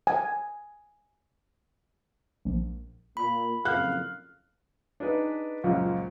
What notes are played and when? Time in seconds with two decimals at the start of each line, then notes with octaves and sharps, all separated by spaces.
0.07 G#5
2.45 A#1
3.17 A#2 B5
3.65 F#1 F2 A#2 F5 F#6
5.00 D4 D#4 G#4 B4
5.64 C#2 F#2 A#2 F3 G#3